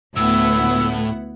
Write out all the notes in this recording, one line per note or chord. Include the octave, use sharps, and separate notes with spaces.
D2 A2 B3 E4 F#5 E6